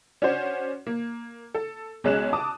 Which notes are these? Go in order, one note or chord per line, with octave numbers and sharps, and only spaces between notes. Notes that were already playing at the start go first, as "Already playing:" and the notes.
C#4 D4 F#4 C5
A#3
A4
B1 G#3 C#4 F#6 E7
A5 D6 D#6